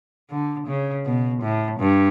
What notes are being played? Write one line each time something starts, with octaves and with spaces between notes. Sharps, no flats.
D3
C#3
B2
A2
G2